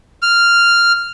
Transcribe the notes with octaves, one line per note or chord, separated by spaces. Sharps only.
F6